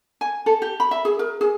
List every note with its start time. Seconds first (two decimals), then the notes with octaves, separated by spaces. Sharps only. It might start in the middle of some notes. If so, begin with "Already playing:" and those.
0.21 G#5
0.46 A4
0.62 G4
0.80 B5
0.91 E5
1.05 G#4
1.19 A#4
1.41 G#4